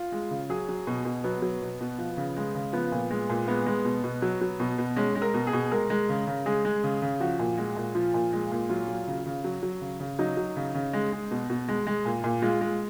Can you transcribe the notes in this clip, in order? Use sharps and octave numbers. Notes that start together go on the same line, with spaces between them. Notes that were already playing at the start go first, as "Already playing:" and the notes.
Already playing: F4
G#3
C#3
F#3 G#4
F#3
B2
B2
F#3 B3
F#3
B2
B2
F3
C#3
G#3
C#3
F3 B3
A#2
G#3
A#2
G#3 B3
G#3
B2
B2
F#3
F#3
B2
B2
G#3 C#4
G#3
A#4
B2
G#4
B2
G#3 A#4
G#3
C#3
C#3
G#3 G#4
G#3
C#3
C#3
F3 F#4
A#2
G#3
A#2
F3 F4
A#2
G#3
A#2
F#3 F4
F#3
C#3
C#3
F#3
F#3
C#3
C#3
F#3 D#4
F#3
C#3
C#3
G#3
G#3
B2
B2
G#3
G#3
A#2
A#2
G#3 F4
G#3